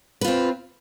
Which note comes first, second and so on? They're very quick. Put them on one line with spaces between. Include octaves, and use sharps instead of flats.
B4 F4 C4